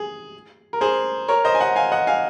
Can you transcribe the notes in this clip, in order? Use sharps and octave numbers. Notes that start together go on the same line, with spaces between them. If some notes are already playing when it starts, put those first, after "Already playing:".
Already playing: G#4
A#4
G#4 C5
A#4 C#5
C5 D#5
G#5
D#5 F#5
F5 G#5
D#5 F#5
F5 G#5